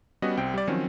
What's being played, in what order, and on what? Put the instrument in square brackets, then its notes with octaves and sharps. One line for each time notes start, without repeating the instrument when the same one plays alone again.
[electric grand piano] G3 B3 C#4 F#4 D#5 F#5
C2 C4 G5
G3 D5
D#3 F3 F#3 C4 C#4